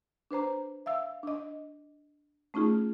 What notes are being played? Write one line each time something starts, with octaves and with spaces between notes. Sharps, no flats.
D4 B4 C5 A#5
E5 F5 E6
D4 D#5
A3 C#4 D#4 F4 G#4